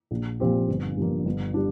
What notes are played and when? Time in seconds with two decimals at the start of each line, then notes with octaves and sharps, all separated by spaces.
0.11 A#1
0.40 A#2 F3 C4 G4
0.68 G1
0.97 G2 F3 A#3
1.26 G1
1.54 G3 D4